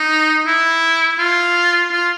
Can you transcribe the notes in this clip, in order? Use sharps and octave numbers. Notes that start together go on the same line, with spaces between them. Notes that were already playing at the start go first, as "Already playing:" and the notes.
Already playing: D#4
E4
F4
F4